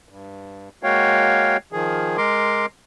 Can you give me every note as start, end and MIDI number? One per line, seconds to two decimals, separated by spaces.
0.09 0.69 43
0.83 1.57 56
0.83 1.57 58
0.83 1.57 66
0.83 1.57 73
0.83 1.57 77
0.83 1.57 79
1.73 2.17 51
1.73 2.17 53
1.73 2.17 68
2.18 2.66 56
2.18 2.66 70
2.18 2.66 84
2.18 2.66 86